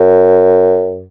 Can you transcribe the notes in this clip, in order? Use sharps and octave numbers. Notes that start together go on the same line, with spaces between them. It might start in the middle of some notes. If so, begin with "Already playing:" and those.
Already playing: F#2